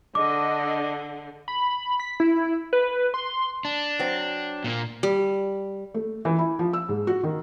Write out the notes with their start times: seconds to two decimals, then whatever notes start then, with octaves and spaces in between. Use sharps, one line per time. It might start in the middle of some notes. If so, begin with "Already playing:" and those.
0.15 D3 D4 D#5 D6
1.48 B5
2.00 B6
2.20 E4
2.73 B4
3.14 C6
3.65 D4
3.99 F#3 C4
4.64 A#2 A#3
5.03 G3
5.94 A3
6.25 E3
6.39 E4
6.59 F3
6.73 E6
6.89 G#2
7.07 F#4
7.23 D#3